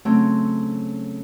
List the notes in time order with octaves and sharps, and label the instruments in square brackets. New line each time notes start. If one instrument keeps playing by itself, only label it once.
[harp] C#3 F#3 A3 C4